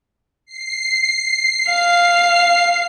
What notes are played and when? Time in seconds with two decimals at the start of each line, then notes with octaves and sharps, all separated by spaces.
0.46 C7
1.71 F5